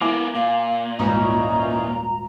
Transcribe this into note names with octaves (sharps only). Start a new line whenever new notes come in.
A#3 B3 E4 E5 G#5 D6
A#2 F5
D#1 G#1 E3 C#4 D#4 A#5